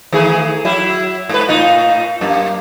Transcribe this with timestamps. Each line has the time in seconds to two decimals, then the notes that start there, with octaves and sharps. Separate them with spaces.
0.13 D#3 A3 G#4
0.65 F#3 E4
1.29 G#2 B4
1.48 A2 D#4 F4
2.21 F#2 A#3